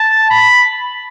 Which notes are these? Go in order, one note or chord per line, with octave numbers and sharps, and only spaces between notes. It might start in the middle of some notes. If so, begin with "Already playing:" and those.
Already playing: A5
B5